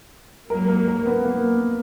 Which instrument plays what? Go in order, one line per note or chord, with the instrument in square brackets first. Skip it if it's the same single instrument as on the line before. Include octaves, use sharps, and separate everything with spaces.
[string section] G#2 F#3 A#3 [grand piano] A#4
[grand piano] A#4
A#4
B3
A#3